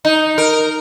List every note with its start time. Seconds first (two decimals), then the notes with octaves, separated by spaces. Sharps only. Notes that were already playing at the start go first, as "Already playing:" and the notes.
0.05 D#4
0.38 A#4